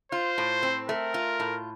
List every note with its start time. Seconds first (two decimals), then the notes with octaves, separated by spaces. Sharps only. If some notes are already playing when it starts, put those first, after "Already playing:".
0.12 F4 C5
0.38 A2
0.63 C4
0.89 A3 A#4
1.14 F4
1.40 A2